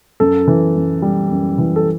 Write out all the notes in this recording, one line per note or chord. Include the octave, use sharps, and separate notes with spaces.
F#2 A4
E3
F#2
G3
F#2
E3
A4